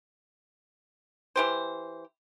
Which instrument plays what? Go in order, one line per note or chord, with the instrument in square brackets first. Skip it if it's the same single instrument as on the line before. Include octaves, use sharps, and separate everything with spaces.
[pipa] E3 G4 C5